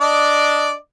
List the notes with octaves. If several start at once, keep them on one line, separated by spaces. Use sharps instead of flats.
D4 D5 D#5